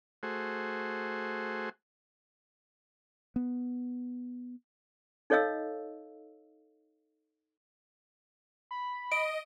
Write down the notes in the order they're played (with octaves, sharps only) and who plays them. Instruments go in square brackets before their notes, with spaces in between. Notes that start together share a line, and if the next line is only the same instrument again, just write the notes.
[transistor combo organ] A3 F#4 G#4 C5
[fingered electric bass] B3
[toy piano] D#4 A4 C#5 D#5 F5 E6
[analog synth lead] B5
[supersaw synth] D#5 [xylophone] D7